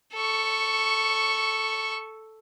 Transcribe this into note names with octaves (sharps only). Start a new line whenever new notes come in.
A4 C#6